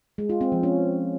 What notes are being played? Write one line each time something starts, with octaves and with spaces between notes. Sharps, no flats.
G#3
F4
C4
F3
C#4